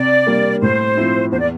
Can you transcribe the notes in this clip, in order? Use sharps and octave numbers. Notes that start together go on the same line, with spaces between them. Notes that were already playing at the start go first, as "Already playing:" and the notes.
Already playing: C3 D5
G3 A#3
A2 C5
F3 C4 E4
E2 C5
D5